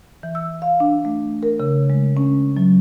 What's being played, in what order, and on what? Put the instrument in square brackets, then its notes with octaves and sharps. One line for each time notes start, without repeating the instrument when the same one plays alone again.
[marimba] E3
E6
F5
D4
A3
A#4
C#3
G#3
C#4
F#3